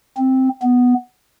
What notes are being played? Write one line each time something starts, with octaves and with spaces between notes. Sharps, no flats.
C4
B3